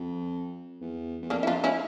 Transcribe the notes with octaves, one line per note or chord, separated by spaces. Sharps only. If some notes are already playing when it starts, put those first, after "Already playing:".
Already playing: F2
E2
E2
F2 A#3 D4
E4
F2 D4 F4
C#4 E4